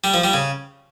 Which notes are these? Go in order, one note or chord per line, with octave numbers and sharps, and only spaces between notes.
G3
F3
G3
C#3